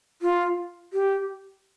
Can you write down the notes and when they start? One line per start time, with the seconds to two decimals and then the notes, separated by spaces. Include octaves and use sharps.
0.22 F4
0.93 G4